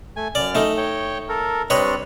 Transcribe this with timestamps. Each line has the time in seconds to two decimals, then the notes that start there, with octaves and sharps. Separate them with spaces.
0.16 A3 G#5
0.35 F#2 D5 F6
0.55 A3 D#4
0.77 C#5 G5
1.29 A4 A#4
1.70 G3 C4 D4 B4 C#5 D#5